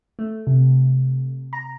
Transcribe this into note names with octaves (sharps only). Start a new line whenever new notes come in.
A3
C3
A#5